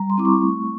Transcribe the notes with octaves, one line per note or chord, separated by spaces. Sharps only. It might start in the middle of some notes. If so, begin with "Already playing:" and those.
Already playing: G3 A#5
C6
C4 E4 D6
C#6
A3